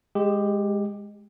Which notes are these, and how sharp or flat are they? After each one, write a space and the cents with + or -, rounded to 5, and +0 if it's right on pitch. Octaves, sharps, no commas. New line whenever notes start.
G#3 -10 G4 +10